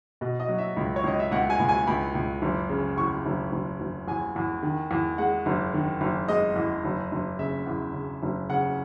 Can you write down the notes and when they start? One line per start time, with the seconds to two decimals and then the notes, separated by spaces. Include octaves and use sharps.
0.21 B2 D#5
0.40 D#5
0.49 F#3
0.58 E5
0.77 C#2
0.96 C#5
1.04 C#2 D#5
1.20 E5
1.31 C#2 F#5
1.50 G#5
1.60 C#2
1.69 G#5
1.87 C#2 B5
2.15 C#2
2.42 F#1
2.69 C#3
2.97 E2 C#6
3.26 F#1
3.52 F#1
3.81 F#1
4.08 E2 G#5
4.36 E2
4.63 D#3
4.91 E2
5.18 G#3 F#5
5.46 F#1
5.74 D#3
6.01 F#1
6.28 G#3 D#5
6.56 E2
6.85 F#1
7.12 F#1
7.39 C#3 E5
7.67 E2
7.94 C#3
8.23 F#1
8.50 C#3 F#5